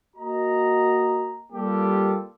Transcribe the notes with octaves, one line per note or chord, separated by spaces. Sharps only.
A#3 F#4 D#5 A#5
G3 A#3 F4 G4 A4